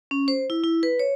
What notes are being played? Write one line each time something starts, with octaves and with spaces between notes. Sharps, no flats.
C#4
C5
E4
E4
B4
C#5